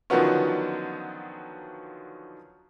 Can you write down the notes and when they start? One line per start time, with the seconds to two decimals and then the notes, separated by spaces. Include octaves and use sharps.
0.10 D3 D#3 F3 F#3 B3 C#4